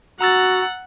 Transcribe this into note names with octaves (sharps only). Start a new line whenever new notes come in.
F#4 F#5 A#5 E6 A6